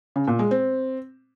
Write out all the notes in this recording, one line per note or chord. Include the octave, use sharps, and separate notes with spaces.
C#3
A#2
G#3
C4